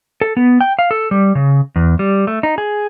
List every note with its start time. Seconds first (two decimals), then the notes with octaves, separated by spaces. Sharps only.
0.21 A4
0.37 B3
0.61 G5
0.79 F5
0.91 A4
1.11 G3
1.35 C#3
1.76 E2
1.99 G3
2.27 A3
2.43 D#4
2.58 G#4